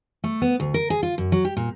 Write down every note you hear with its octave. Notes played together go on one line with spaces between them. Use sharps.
A3
B3
D2
A#4
G#4
F4
F#2
F#3
G4
A#2